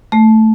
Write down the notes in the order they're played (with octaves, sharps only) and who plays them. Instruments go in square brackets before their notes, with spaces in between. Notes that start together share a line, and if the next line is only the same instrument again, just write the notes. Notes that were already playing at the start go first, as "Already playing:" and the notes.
[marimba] A3